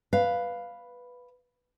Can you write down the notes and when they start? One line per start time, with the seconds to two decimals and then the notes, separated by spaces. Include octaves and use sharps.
0.13 B4 F5